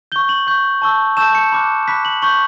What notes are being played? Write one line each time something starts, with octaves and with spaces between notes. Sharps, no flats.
C#6 G6 G7
F#7
C#6 G6
A5 C#6 E6 G6
A5 C#6 E6 G6 E7
C#7
B5 D6 F#6
B5 D6 F#6 B6
F#7
C#6 G6 F#7